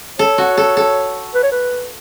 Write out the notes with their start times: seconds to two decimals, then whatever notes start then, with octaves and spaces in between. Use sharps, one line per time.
0.19 A4 C#5
0.38 F#4
0.57 A4
0.77 A4
1.35 B4
1.43 C#5
1.52 B4